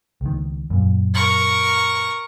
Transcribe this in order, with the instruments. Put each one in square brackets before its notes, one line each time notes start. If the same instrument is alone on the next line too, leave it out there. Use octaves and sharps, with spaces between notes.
[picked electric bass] C#2 D#3
F#2 A#2
[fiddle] A#4 C#6